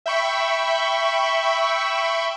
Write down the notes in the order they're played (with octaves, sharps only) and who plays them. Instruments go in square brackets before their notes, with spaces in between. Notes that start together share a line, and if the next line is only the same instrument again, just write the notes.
[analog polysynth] E5 G5 B5 C#6